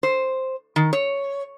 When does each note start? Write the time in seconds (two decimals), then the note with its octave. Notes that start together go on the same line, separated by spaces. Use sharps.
0.03 C5
0.76 D#3
0.93 C#5